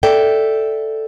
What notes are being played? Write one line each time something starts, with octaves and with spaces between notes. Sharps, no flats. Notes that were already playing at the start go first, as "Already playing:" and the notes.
A4 D5 E5 G5